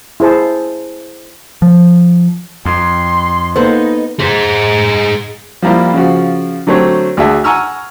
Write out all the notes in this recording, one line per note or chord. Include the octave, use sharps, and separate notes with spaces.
E4 G#4 C5 A5
F3
F2 C6
A#3 B3 D#4 A4 C5 F#5
G#4 C5
F3 G3 A#3 E4 G4
C#3 F3 F#4
D3 F#3 A3 C4 G4 C#5
D2 F#4 G#4 E5 A5
F#5 G#5 A#5 C#6 E6 F6